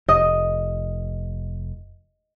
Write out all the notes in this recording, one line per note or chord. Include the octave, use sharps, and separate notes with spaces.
F1 D#5